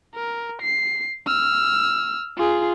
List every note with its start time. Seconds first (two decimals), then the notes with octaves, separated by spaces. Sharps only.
0.15 A#4
0.62 C7
1.27 E6 F6
2.37 F4 G#4